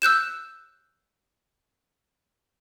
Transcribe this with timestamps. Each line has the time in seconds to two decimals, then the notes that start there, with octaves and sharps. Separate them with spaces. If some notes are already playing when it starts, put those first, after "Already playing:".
0.02 E6 F#6 G6 E7